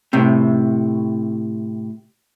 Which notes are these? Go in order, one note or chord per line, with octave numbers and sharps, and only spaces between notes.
A2 C3